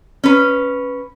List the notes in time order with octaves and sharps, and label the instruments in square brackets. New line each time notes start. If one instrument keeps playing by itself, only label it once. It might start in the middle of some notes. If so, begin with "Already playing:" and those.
[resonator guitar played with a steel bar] C#4 B4